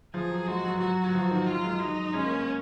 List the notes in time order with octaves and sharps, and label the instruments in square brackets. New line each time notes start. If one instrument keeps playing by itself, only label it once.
[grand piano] F3 [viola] G#4
[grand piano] F#3
[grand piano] G#3 [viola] F#4
[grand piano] F#3
[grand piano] F#3 [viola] F#4
[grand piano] F#3
F3
D#3
[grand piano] F#3 [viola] F4
[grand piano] F#3
G#3
[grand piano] F#3 [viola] D#4
[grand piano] G#3 [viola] C#4
[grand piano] A#3
G#3